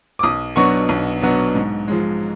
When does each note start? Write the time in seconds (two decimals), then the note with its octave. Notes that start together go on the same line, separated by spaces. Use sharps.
0.19 D6
0.23 B1 D#6
0.56 B2 F#3 B3 D4 C#6
0.89 B1
1.22 B2 F#3 B3 D4
1.55 G#2
1.88 F3 G#3